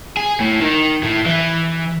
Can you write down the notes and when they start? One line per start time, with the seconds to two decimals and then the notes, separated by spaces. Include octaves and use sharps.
0.17 G#4
0.40 A2
0.60 D#3
1.03 A2
1.26 E3